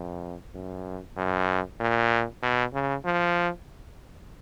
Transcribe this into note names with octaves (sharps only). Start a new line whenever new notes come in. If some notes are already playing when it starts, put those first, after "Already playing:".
Already playing: F2
F#2
F#2
A#2
B2
C#3
F3